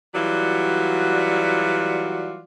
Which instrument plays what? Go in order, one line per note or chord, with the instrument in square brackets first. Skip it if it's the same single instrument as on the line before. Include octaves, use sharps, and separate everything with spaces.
[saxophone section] E3 F#3 G3 F4 F#4 D5